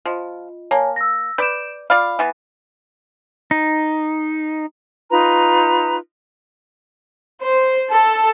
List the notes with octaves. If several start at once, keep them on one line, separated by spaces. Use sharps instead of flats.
F3 F4 D#5
A#3 C#5 G#5 A5
E6 A#6
B4 D5 G6 D7 E7
F4 D5 F5 B5
E3 B3
D#4
D#4 F4 B4 A#5
C5
A4